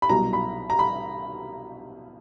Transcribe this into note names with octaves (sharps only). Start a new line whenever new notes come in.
B5
C2 B2 F#3 A#5
B5
A#5
B5